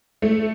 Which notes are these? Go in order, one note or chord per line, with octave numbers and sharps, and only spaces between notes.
A3